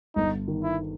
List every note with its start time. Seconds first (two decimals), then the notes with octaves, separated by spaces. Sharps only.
0.16 G1 D#4
0.48 D#3
0.63 E4